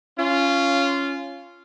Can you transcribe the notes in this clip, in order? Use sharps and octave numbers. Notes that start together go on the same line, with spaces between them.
C#4 F4